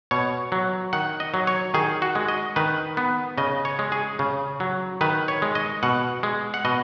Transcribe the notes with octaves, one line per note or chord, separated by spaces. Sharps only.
B2 C#5
F#3
D#3 F#5
D#5
F#3
C#5
D#3 G#4
F#4
G#3
D#5
D#3 B4
B3
C#3 D#5
C#5
G#3
G#4
C#3
F#3
D#3 B4
C#5
G#3
D#5
B2 F#5
G#3
F#5
B2 D#5